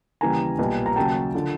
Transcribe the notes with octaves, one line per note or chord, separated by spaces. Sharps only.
D#2 C#3 E3 G3 G#5 A#5
B1 A#2 G3 B3
A#5
D#2 C#3 F#3 G5 A5
D3 F3